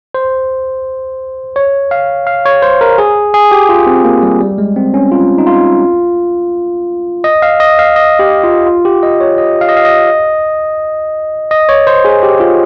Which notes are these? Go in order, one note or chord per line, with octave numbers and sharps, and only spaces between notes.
C5
C#5
F5
F5
C#5
C5
A#4
G#4
G#4
G4
F4
C4
A#3
G3
G3
G#3
C4
C#4
F4
D#4
F4
D#5
F5
D#5
F5
D#5
G4
F4
F4
G4
D#5
C#5
D#5
F5
D#5
F5
D#5
D#5
C#5
C5
G#4
G4
F4